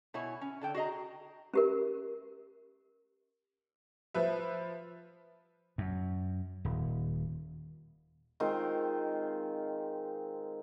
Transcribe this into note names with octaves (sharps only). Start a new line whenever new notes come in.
B2 E4 C#5 G#5
C#4
D3 A4 G5
F#4 G#4 D#5 A#5
C#4 G4 A#4
F3 B4 E5
F#2
D#1
D#3 G#3 C4 F4